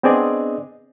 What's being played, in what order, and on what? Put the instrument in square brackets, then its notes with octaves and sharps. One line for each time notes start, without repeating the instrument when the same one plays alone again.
[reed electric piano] B3 C4 D4 G#4 D5 D#5